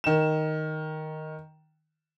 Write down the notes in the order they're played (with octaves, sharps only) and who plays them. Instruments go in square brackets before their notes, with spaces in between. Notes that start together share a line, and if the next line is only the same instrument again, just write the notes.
[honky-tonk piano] D#3 E7